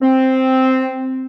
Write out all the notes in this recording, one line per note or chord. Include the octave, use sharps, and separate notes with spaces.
C4